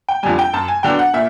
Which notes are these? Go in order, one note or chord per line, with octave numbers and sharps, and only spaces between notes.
G5
F2 D3 G3 G#5
G5
F#2 A5
G#5
D3 F#3 B3 D4 G5
F#5
A#2 E5